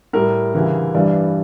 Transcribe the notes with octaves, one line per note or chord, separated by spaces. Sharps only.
A2 G3 A#4
D2 C#3 E3 G3
G2 E3 G3 D5